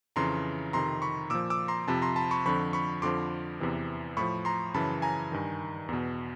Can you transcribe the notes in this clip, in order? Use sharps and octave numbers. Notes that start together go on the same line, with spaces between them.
F2 C#3 E3 A#5 C6
F2 C3 D#3 A#5 C6
B5 C#6
A#2 F3 D6 E6
D6 E6
A#5 C6
F2 C3 F3 A5 B5
A#5 C6
A5 B5
B5 C#6
F2 D3 F3 B5 C#6
B5 C#6
F2 D3 F3 C6 D6
E2 C3 E3
A2 F3 B5 C#6
A#5 C6
F#2 C#3 E3 A5 B5
G#5 A#5
G2 D#3
E2 B2